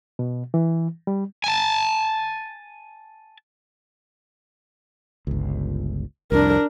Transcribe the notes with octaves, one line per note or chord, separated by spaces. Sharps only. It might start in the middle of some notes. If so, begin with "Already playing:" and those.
B2
E3
G3
G#5 A5
G1 C#2
C2 F2 D4 A#4